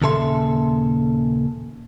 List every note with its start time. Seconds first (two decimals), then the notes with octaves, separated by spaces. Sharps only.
0.02 D#2 A#2 C#3 A4 E5 C6